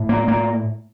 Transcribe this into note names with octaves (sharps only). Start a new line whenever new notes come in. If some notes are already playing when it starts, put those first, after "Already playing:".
Already playing: A2
A#3
A#3